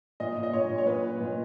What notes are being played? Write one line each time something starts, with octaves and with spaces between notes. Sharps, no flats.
A#2 D#5
A#2
D#5
A#2 C#5
A#2
C#5
A#2 B4
A#2
A#2